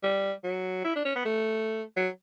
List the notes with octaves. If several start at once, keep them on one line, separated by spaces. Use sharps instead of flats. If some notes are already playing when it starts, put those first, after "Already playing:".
G3
F#3
E4
D4
C#4
B3
A3
F#3